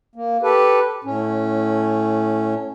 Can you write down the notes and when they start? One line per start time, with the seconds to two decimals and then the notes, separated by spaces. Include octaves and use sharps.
0.16 A#3
0.43 G4 A4 B4
1.04 A2 C#4